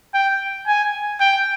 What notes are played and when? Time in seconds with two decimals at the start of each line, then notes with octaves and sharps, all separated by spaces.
0.14 G5
0.67 G#5
1.20 G5